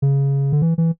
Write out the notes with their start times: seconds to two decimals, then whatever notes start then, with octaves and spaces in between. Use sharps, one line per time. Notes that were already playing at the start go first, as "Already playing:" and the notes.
0.02 C#3
0.52 D3
0.62 E3
0.78 E3